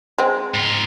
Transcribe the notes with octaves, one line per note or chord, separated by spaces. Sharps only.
G#3 C4
G#2 F4